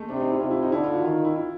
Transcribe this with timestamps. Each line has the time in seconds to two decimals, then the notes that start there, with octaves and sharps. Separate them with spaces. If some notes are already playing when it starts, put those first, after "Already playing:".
Already playing: G#3 A3
0.09 C3 D4
0.20 D#4
0.30 E4
0.40 C3 F4
0.51 E4
0.63 D#4
0.72 D3 E4
0.84 F4
0.94 F#4
1.03 D#3 F4
1.25 E4
1.36 E4